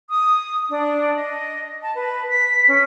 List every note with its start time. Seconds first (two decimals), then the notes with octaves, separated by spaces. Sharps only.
0.09 D#6
0.69 D4
1.15 D#5
1.82 A5
1.95 B4
2.29 B6
2.68 C#4